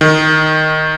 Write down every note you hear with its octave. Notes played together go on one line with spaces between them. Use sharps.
D#3